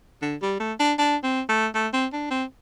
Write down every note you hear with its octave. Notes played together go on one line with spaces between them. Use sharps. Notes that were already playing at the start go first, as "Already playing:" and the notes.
D3
G3
A3
D4
D4
C4
A3
A3
C4
D4
C4